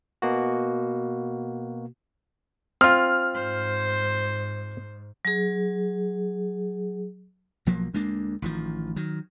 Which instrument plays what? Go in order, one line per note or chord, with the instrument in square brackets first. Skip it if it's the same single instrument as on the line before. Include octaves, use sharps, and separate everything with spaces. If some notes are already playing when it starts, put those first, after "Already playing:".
[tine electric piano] B2 A#3 F#4
[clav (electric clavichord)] C4 F4 [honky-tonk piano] F6
[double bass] G#2 [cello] C5
[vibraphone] F#3 G#4
[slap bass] B1 F3 F#3 A#3
D2 G#3 A#3 D4
A1 D#3 F3
D#3 F#3